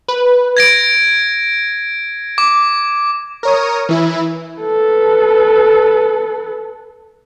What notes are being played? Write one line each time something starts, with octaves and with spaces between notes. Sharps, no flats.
B4
G#6 A#6 D7
D6
A#4 C#5 D#6
E3 E4
A4 B4